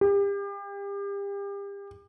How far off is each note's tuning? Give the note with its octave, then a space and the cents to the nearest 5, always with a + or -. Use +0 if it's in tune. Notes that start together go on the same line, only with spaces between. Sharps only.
G4 +35